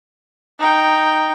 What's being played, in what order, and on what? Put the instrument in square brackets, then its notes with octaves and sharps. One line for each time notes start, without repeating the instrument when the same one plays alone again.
[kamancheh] D#4 G5